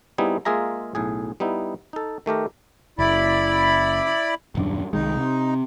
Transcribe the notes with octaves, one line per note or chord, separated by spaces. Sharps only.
G3 B3 C4 D#4 E4 G#4
G#3 A#3 F4 G#4 E5 A#5
B1 A2 G#4
G3 B3 D#4 E4
D#4 A4
D#3 A3 G4 A#4
F#1 E4 D5 B5
D#1 F#2 D4
C2 D#3 G#3 D#4
C3